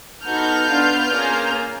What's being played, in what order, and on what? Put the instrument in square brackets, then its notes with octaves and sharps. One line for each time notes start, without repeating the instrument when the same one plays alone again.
[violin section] B3 D#4 F#4 A4 F6 G6
B3 D4 F4
A#3 C#4 F4 G#4